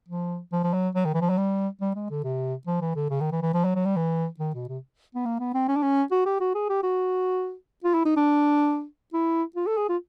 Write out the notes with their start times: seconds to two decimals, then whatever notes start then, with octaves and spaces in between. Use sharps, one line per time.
0.08 F3
0.52 F3
0.63 F3
0.73 F#3
0.95 F#3
1.05 D#3
1.14 E3
1.21 F3
1.30 F#3
1.37 G3
1.81 G3
1.95 G#3
2.10 D3
2.24 C3
2.67 F3
2.81 E3
2.96 D3
3.10 C#3
3.20 D#3
3.32 E3
3.42 E3
3.54 F3
3.65 F#3
3.75 F#3
3.85 G3
3.96 E3
4.39 D#3
4.54 B2
4.68 C3
5.15 B3
5.26 A#3
5.40 B3
5.54 C4
5.68 C#4
5.76 D4
5.83 C#4
6.11 F#4
6.26 G4
6.40 F#4
6.55 G#4
6.69 G4
6.83 F#4
7.84 F4
7.94 E4
8.05 D#4
8.16 D4
9.13 E4
9.56 F4
9.67 A4
9.77 G#4
9.89 F4